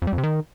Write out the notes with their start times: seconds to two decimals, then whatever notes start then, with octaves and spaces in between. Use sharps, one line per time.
0.02 F2
0.07 G3
0.13 F2
0.18 C3
0.23 D#3